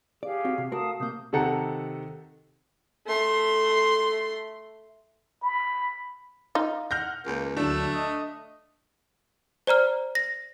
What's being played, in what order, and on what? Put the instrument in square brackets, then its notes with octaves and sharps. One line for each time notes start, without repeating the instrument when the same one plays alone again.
[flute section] G4 G#4 F5 [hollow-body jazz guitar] D5
[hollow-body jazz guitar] C4 F#4
C3
[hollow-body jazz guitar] A3 F#4 A#4 [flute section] F5 A5 D#6
[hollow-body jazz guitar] C3 A#3 [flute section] D#6 G6
[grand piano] C3 D#3 A4 F#5 A#5 C#7
[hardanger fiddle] A3 C6
[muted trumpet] B5
[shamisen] D#4 F4
[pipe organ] F#5 [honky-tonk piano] F6 G6 A#6
[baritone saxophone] C#2 [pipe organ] A#3
[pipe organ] D2 F#3 E6 [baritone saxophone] A3 [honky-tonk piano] D4
[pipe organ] D#5
[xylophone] C5 D5 A#5 F6
A#6